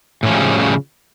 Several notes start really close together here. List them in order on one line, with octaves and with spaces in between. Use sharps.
A2 C#4 F3 G3 C#3